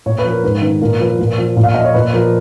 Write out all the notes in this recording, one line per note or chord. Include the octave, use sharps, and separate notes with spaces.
A#2 C#5
B4
F3
A#4
G#2 B4
D#3 B4
A#2 A#4
F3 B4
A#2 A#4
F3
A#2
F5
F3 D#5
C#5
A#2 B4
F3 A#4